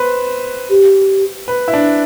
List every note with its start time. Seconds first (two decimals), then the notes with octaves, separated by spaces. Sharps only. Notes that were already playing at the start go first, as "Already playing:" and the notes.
Already playing: B4 C5
0.70 G4
1.48 B4
1.68 E4
1.73 D4